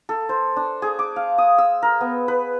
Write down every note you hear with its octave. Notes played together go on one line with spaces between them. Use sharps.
A4
C5
D4
G#4
D6
F5
D#6
E6
A#4
B3
B4